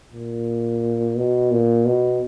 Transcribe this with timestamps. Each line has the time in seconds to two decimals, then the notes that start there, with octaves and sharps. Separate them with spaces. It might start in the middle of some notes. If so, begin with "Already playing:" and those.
0.12 A#2
1.17 B2
1.51 A#2
1.86 B2